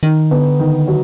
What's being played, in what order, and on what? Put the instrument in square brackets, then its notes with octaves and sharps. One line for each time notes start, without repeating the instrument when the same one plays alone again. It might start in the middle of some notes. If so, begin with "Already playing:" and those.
[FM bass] D#3 [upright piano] D#4
[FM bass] D3 [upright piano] B3
[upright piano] D#3
F#3